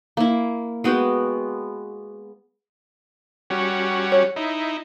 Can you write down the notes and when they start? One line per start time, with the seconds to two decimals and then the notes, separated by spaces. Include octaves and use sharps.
0.17 A#3 E4
0.84 G#3 B3 F#4 G5
3.50 G3 C#4 F#4
4.12 C#5
4.36 D#4 E4